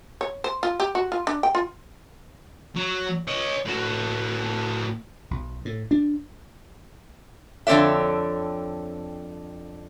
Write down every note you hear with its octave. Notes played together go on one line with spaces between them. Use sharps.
C#5
C5
F4
G4
F#4
F4
D4
G5
F4
F#3
C#5 D#5
A2 F#4
B1
A2
D4
F2 D3 C4 C#5 D5 E5